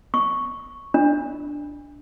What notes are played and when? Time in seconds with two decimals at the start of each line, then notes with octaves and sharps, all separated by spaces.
0.14 C#6
0.94 D4